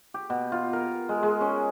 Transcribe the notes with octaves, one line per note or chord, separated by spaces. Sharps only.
G4
B2
F4
A#4
G#3
G#3
C#4